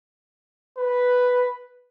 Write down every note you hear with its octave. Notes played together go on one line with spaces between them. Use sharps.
B4